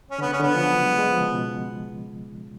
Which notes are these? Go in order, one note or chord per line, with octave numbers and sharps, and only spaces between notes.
C#4
D3
C#3 B3
C#4
D3 B3
F3
F#3
G#3
G#3
F3
C#3
B2